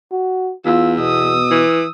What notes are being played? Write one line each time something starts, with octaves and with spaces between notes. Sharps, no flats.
F#4
E2 F4 E6
B2 D#6 E6
E3